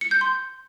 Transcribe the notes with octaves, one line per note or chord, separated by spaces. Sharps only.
C#7
G6
C6